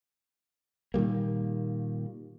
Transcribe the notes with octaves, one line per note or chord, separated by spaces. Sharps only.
A#2 D#3 G3 A#3